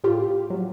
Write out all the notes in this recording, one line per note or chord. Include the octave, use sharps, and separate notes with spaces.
A2 F4 G4
F#3